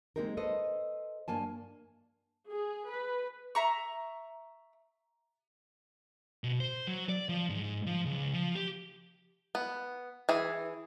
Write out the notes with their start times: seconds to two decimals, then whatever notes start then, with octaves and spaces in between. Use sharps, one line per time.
0.16 G#3 A#3 C4 D#4 G4 A#4
0.37 A4 B4 C5 D#5
1.28 G2 A#3 G#5 A5
2.49 G#4
2.88 B4
3.55 E5 A#5 C#6
6.44 B2
6.60 C5
6.87 F#3
7.09 D5
7.29 F3
7.49 G#2
7.87 F3
8.05 C#2
8.33 F3
8.55 G4
9.55 B3
10.29 E3 G#4